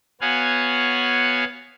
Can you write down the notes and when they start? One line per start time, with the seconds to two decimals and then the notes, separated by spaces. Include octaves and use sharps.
0.21 B3 F#4 C#5 F5 F#5 G#5